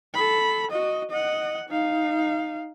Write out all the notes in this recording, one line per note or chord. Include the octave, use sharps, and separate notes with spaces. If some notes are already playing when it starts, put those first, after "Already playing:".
A4 B5
F#4 D#5
D#5 F#5
D#4 F5